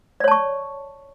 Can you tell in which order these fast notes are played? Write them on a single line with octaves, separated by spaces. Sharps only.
D5 C#5 A5 C#6